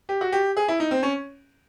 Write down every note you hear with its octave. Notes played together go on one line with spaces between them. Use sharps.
G4
F#4
G4
G#4
E4
D#4
C4
C#4